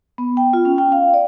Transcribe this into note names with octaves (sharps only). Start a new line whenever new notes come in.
B3
G5
F4
C#4
G5
F5
D5